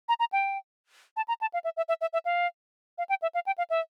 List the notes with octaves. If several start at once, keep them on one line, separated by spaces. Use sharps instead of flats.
A#5
A#5
G5
A5
A#5
A5
F5
E5
E5
E5
E5
E5
F5
F5
G5
E5
F5
G5
F5
E5